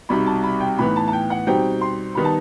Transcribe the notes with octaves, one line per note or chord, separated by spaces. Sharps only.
C2 B2 G3 D#4 B5
A5
B5
G5
A2 E3 B3 D#4 B5
A5
A5
G5
F#5
B2 G3 C4 D#4 G5
C6
D#3 G3 B3 D#4 B5
A5